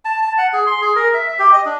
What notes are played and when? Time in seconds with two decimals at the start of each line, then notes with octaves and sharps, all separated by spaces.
0.05 A5
0.22 A5
0.38 F#5
0.53 G#4
0.67 C6
0.81 G#4
0.96 A#4
1.14 E5
1.26 E5
1.39 G4
1.53 D#5
1.66 D4